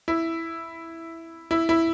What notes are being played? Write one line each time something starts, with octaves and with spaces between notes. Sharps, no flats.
E4
E4
E4